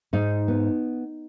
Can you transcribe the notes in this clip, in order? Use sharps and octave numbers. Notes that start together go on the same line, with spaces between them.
G#2 D#4
B3